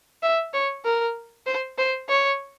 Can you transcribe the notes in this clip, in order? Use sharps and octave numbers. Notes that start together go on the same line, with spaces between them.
E5
C#5
A#4
C5
C5
C#5